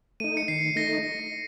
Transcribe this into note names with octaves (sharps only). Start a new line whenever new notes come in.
A3 D#4 D#7
C#7
D#3 C7
A3 D#4 A#6